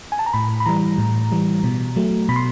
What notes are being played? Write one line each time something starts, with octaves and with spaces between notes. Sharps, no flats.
G#5
A5
A#5
A2 B5
B5
E3 G3 A#5
A2
E3 G3
B2
F#3 A3
B2 B5
C6